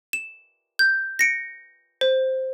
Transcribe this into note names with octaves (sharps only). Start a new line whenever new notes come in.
E7
G6
A#6 C#7 D7
C5